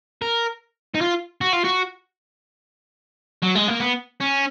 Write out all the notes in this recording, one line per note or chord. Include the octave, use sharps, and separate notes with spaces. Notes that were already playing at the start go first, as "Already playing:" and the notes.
A#4
D#4
F4
F#4
F4
F#4
F#3
G#3
A#3
B3
C#4